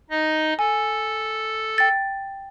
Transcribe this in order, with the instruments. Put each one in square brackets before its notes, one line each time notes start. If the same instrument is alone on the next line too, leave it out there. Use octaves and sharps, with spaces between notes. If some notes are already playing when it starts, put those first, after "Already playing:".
[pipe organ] D#4 D#5
[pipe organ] A4 [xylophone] G#5
[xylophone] G5 A6